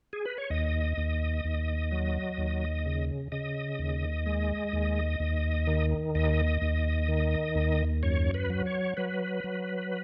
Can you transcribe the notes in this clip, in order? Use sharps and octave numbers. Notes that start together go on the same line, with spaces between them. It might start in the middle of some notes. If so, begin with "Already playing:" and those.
G#4
B4
C#5
D#2 D#5
D#2
D#2
F#3
D#2
C#3
C#3 D#5
D#2
G#3
D#2
D#2
D#3
D#2 D#5
D#2
D#3
D#2
F#2 C#5
B4
F#3
C#5
F#3 B4
F#3